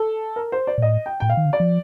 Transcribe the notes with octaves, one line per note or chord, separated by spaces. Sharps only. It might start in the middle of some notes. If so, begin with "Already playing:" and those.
Already playing: A4
A#4
C5
D5
A#2
A2 D#5
G5
A2 G5
A#2 F5
D#3
D3
D5
F3